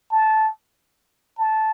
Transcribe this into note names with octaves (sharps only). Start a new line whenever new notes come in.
A5
A5